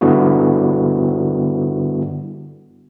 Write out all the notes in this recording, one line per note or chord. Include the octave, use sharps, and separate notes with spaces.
G2 D3 G3 B3 E4 F#4